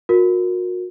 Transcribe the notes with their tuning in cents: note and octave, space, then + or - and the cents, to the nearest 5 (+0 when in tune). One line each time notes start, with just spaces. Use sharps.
F#4 -35 A#4 +0